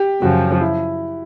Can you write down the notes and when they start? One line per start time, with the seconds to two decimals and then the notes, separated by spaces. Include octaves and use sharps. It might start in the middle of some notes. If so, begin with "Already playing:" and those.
Already playing: G4
0.22 F#2 C#3 F3 F#4
0.61 E4